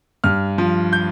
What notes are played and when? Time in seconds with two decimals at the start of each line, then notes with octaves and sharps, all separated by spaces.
0.24 G2 F6
0.58 F3
0.93 G6